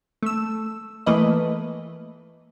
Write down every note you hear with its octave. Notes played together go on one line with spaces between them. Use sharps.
A3 E6
E3 A3 A#3 B4 D#5